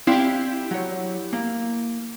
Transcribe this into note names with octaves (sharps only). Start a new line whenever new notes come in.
C4 D4 E4 G4 F5
F#3 C#5
A#3